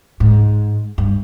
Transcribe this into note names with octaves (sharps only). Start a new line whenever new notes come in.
G#2
G2